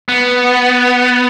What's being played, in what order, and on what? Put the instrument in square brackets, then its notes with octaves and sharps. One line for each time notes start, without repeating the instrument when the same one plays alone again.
[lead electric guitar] B3